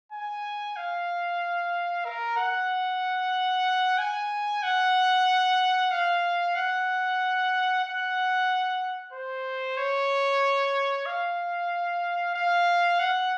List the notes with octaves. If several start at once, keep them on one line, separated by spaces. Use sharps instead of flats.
G#5
F5
A#4
F#5
G#5
F#5
F5
F#5
F#5
C5
C#5
F5
F5
F#5